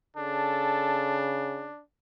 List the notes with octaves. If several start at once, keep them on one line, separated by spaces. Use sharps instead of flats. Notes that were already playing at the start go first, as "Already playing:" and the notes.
C#3 D4 A4